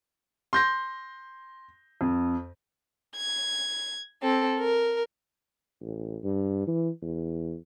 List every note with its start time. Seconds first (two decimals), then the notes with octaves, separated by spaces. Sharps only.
0.53 C6 G6 A#6
2.01 F2
3.16 G#6
4.22 C4 A4
4.59 A#4
5.81 A1
6.23 G2
6.67 E3
7.02 E2